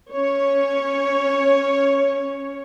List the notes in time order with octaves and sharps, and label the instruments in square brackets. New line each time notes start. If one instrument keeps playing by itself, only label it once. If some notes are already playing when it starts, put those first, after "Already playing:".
[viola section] C#4 C#5